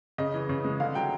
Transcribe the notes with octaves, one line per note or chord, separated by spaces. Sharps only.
C#3 D#5
E3
C#3
G#3
D3 F5
F#3 G5